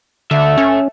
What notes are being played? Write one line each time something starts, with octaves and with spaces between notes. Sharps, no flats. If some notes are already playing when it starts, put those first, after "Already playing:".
D3 A4 E5
C#4